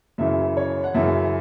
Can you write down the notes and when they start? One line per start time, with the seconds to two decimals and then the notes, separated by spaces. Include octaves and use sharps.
0.18 F#2 C#3 E3 E5
0.57 C#5
0.84 F#5
0.94 F#2 C#3 E3 E5